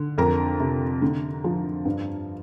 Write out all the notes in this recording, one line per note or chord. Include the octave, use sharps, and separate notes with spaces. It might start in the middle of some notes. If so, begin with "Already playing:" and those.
Already playing: D3
F2 A#4 A#5
C3
D3
F3
G2